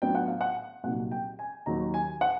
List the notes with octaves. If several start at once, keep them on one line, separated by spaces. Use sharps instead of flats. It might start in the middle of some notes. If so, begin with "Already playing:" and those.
A2 F#3 B3 D4 F4 G5
F#5
F5
F#5
C2 A#2 F#3 A#3 D#4 F#5
G5
G#5
D#2 D#3 F#3 A#5
G#5
F#5